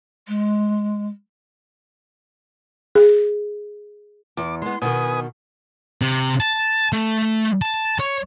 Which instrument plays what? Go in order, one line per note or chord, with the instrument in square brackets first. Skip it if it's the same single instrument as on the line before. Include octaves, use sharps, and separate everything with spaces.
[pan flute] G#3
[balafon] G#4
[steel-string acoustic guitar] E2 [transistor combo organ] D6
[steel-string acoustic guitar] G#3 B3 [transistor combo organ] C6
[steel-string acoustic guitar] B2 D#3 [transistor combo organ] B4 G#5 D#6
[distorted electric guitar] C3
A5
A3
A5
C#5